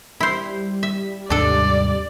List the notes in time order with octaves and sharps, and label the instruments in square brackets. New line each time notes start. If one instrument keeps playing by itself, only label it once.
[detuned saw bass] G3 [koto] E4 C5
[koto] E5
[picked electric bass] D#2 G#2 C3 [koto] D4 A4 [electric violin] D5